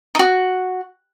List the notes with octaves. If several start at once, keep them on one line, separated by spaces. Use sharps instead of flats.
D#4 F#4